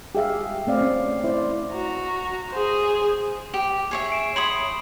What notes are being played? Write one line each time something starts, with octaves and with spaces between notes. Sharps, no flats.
G4 G#4 E5 F5
A3 C4 D5 F5
C#4
E4 C5 D5
F#4 A#5
G#4 C5
G4
G#4 C#5 E5
C7 D7 E7
C#5 B5 C6 D#6 F#7